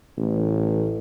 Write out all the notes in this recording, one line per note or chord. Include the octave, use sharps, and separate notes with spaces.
A1